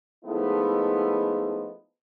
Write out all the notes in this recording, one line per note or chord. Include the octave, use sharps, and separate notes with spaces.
F3 G#3 A3 B3 D#4 E4